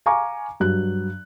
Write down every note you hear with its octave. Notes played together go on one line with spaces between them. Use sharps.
F5 G#5 A#5 C#6 D6
G2 F#3 F#6